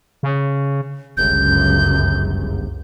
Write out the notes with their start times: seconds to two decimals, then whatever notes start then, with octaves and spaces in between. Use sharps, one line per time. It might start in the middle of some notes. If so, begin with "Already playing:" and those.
0.23 C#3
1.17 G1 C#2 F#2 G6